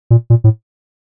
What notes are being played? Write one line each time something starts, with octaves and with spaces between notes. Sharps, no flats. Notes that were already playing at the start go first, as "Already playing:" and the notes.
A#2
A#2
A2